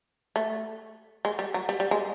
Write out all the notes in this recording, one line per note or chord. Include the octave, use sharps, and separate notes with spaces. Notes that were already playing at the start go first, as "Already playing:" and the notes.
A3
G#3
G3
F#3
G3
G3
G#3